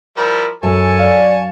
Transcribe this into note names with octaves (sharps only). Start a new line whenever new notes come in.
F3 G3 E4 A#4
F#2 A4 C#5 G#5 A5
D5 F5